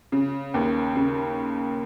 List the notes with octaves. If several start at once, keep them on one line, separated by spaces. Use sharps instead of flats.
C#3
D#2
C#3